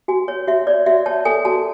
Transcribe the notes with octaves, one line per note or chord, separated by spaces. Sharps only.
F#4 G#5
C#5
F#4 E5
C#5 D5
F#4 E5
C#5 A5
A4 G#5
F#4 A5